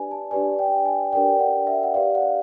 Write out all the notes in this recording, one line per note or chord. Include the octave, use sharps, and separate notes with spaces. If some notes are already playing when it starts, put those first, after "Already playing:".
Already playing: D4 G4 B4 D5 G#5
A5
D4 G4 B4 D5 G#5
G5
G#5
D4 G4 A#4 D5 G5
F#5
E5
F#5
G4 B4 D5 F5
F#5